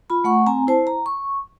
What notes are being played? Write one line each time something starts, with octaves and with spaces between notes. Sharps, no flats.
F4 B5
A3 F#5 C#6
C4 G#5 A#5
E4 C5 A5
A#5
C#6